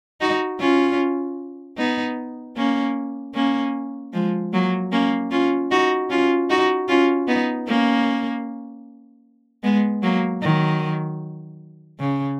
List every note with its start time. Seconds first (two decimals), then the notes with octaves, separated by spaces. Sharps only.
0.21 D#4 F#4
0.60 C#4 F4
1.77 B3 D#4
2.57 A#3 C#4
3.34 A#3 C#4
4.13 F3 G#3
4.53 F#3 A#3
4.92 A#3 C#4
5.31 C#4 F4
5.71 D#4 F#4
6.10 C#4 F4
6.50 D#4 F#4
6.88 C#4 F4
7.27 B3 D#4
7.67 A#3 C#4
9.63 G#3 B3
10.02 F#3 A#3
10.42 D#3 F#3
12.00 C#3